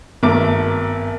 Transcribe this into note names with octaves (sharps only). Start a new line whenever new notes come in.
G#1 G2 A3 B3 A#4 D6